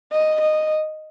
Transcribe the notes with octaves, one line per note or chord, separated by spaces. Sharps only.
D#5
D#5